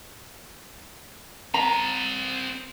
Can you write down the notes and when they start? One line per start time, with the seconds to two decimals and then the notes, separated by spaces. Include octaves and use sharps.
1.54 C4 A#5 B5